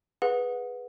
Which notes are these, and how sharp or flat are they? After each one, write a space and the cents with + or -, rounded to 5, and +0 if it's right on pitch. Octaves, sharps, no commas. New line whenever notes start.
G#4 +0 B4 +0 F#5 -25